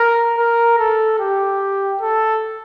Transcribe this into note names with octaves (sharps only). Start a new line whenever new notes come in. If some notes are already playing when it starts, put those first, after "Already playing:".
Already playing: A#4
A#4
A4
G4
A4